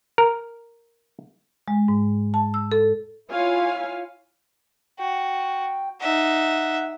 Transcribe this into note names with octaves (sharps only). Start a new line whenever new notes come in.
A#4
G#3
G#2
A5
E6
A4
E4 F4 C#5 F5 G#5
F#4 G5
D#4 E5 F#5